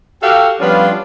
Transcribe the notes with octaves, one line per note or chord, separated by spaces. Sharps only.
F#4 G4 A4 F5 G5
F3 G3 B3 C#4 D4 F4